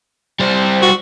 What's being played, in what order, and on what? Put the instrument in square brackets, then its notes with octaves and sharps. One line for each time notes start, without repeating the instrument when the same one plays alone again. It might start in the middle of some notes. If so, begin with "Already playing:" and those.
[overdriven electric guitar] G3 C5
[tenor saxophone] F#4